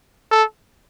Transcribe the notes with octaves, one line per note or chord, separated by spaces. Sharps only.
A4